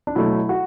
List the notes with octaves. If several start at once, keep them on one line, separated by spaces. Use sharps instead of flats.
D4
B2 F#3 A3 E4
F#4